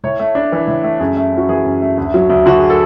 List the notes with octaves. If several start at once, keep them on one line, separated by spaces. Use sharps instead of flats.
A2 C#5
A3
D4
E3
A2
A3
F#2 G#4
A3
C#4
F#4
E3 G#4
F#2
A3
D2
F#3
D2
D3 F#4
G#4
A4